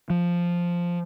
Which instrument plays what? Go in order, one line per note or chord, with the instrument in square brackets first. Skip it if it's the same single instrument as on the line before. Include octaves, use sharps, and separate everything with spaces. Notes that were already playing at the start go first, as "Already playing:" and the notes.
[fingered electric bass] F3